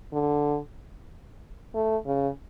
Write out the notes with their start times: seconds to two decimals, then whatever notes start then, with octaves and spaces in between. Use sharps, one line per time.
0.13 D3
1.74 A3
2.06 C#3